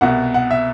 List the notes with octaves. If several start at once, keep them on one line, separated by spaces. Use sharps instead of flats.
C2 B2 F#5
F#5
E5